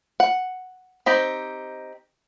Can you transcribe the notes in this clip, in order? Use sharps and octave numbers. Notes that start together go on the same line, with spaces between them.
F#5
C4 D#4 G4